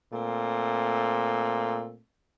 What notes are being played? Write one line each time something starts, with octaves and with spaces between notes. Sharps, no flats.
A#2 A3 C4